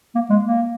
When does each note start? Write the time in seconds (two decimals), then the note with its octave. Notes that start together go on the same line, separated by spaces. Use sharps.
0.15 A#3
0.30 G#3
0.44 A#3